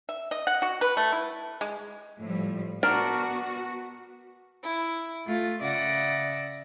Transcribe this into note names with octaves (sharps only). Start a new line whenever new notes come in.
E5
D#5
F#5
F#4
B4
A3
E4
G#3
A2 F3 G3
B3 D4 F#4 A#4
E4
A3 F4
C#3 D5 E5 F#5 A#6